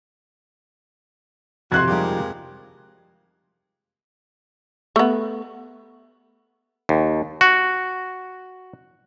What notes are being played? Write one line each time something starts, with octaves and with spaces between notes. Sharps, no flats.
F2 G#2 C3 D#3 F#4 C6 F#6 G#6
F3 G3 G#3 A#3 D#4 G4
A3 B3
D#2
F#4